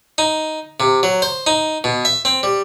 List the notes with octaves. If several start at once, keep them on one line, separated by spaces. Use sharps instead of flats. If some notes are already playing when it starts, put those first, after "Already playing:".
D#4
C3
F#3
C5
D#4
B2
E5
C4
G3